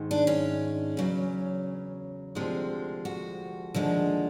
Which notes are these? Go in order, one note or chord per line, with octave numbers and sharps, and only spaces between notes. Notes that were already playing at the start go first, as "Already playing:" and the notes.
Already playing: G#2 D#3 G#3
D4
C#4
E2 C#3 F#3
D2 C3 F3 G#3
F#4
D#2 D3 F3 G#3